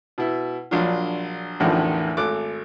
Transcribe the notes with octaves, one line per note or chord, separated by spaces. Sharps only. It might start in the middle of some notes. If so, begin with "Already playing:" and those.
B2 E4
A#1 F#3 D4 F4
A1 E2 A2 D3 D#3 F3
G#1 A3 D6 F#6